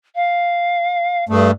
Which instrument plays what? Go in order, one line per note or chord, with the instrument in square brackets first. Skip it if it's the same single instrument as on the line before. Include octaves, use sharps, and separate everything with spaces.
[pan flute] F5
[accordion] G2 A3 [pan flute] G#4